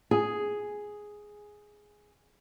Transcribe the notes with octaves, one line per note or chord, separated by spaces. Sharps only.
G#4